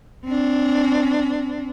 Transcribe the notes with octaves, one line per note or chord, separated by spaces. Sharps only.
C4 D4